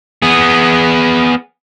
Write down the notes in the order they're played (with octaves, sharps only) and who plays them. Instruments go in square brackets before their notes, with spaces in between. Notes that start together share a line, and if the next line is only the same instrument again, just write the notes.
[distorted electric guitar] B3 G#4